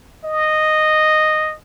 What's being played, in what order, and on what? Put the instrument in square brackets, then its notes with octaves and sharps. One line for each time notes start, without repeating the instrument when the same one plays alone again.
[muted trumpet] D#5